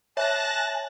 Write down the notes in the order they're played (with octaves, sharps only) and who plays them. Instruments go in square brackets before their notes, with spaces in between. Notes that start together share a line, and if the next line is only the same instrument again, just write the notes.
[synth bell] C#5 E5 [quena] G#5 [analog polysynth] A5 F#6 A#6